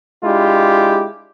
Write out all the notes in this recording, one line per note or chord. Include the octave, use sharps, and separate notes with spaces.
G#3 D4 E4 F4 G4